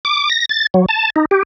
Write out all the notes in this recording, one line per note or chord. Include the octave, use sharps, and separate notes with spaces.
D6
A#6
A6
F#3
A5
D#4
G4